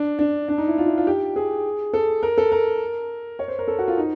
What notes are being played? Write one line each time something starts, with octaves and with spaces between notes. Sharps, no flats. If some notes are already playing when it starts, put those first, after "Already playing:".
Already playing: D4
D4
D4
D#4
E4
F4
E4
F4
G4
G#4
A4
A#4
A4
A#4
C#5
C5
A#4
A4
F#4
F4
D#4